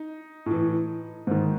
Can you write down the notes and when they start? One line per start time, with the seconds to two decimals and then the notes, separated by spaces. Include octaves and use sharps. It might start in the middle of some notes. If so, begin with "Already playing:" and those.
Already playing: D#4
0.46 A2 E3
1.27 G#2 D#3